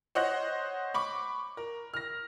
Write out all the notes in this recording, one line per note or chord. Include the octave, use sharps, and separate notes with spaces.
C5 C#5 D#5 F#5 F#6 A#6
B5 C#6 D6
A#4
F6 A#6